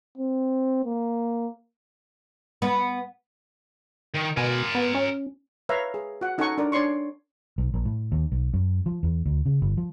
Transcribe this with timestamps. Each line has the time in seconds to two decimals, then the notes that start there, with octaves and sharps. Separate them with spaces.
0.18 C4
0.85 A#3
2.62 B3
4.15 D#3
4.37 B2 A#4 G#5
4.75 B3
4.95 C#4
5.69 B4 C#5 E5 F5 A#5
5.94 G#4
6.21 F#4 F#5
6.38 C#4 D#4 A4 F#5 G#5 C#6
6.58 D4 A#4 D5
6.72 D4 C#5 D5 C6 C#6
7.58 B1
7.74 A#1
7.85 A2
8.12 D#2
8.32 B1
8.54 F#2
8.86 F3
9.03 E2
9.26 D2
9.46 C#3
9.62 G1
9.77 F3